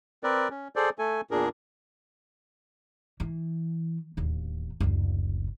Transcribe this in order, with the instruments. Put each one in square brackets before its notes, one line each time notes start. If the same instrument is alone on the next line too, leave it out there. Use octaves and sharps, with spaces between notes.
[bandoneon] C4 A#4 B4 D5
C#4
G#4 A4 C5 D5
A3 A4 G#5
E2 A#2 D4 G#4 A#4
[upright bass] E3
D1 D#2
F#1 D2